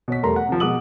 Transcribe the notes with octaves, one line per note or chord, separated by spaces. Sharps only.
B2 C#5 B6
E2 G3 A3 A#4 A#5 C6
F#5
C3 F3
B2 G#3 F#5 D6 D#6 F#7